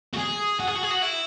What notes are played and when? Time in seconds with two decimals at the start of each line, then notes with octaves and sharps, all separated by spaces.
0.14 F#4
0.17 G#4
0.60 F#4
0.67 G#4
0.75 F#4
0.83 G#4
0.91 F#4
1.02 E4